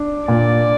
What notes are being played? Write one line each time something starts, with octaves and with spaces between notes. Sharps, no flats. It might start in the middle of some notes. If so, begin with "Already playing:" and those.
Already playing: D4
A#2 D5